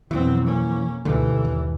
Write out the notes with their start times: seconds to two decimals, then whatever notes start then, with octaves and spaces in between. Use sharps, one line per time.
0.11 F2 B2 E3 F#3 B3 C4
0.44 A#3 C#4
1.05 D2 G#2 B2 D3 E3 G3 A3
1.45 G1 D#2